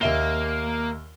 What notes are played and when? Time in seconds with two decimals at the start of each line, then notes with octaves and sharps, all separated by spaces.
0.01 D#2 A#3 E5 G7